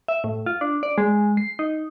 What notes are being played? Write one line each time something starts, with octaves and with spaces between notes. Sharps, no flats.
E5
A2
F4
D4
D5
G#3
C7
D#4